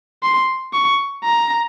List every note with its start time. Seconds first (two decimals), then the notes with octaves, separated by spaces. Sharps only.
0.23 C6
0.73 C#6
1.24 A#5